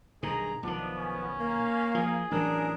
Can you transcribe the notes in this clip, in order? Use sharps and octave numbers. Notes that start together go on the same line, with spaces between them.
B1 G2 D#3 G#4 A#5
B1 D#3 F3 B3 D4
C#4
A#3 F5
F3 G#4
A1 E3 F#3 D4 A#4